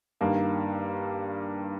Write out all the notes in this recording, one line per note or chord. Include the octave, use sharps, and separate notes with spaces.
G2 D#3 A#3